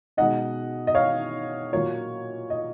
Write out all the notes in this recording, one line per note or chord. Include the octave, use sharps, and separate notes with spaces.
B2 G#3 D#4 D#5 F#5
D#5
C#5 F5
A#2 F#3 A#3 F4 C#5
D#5